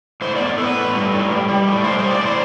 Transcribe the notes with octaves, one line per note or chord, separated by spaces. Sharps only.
A2 C5
B3 D5
A2 A4 B4
A2
G3
A2
G3
G3
A2
G3 C5
A2 C5
D5
A2
C5